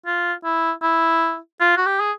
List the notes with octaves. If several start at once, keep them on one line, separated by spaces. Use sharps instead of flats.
F4
E4
E4
F4
F#4
G4
G#4